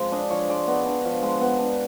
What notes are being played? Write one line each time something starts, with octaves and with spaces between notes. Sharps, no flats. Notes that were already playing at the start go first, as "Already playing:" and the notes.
Already playing: F3 G#3 C4
D4 D#5
F3 C#5
G#3 D5
B3 D#5
D4
F3
G#3
B3
D4